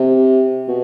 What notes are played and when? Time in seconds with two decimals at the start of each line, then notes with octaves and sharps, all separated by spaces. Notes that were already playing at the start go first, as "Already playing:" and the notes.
Already playing: C3
0.68 B2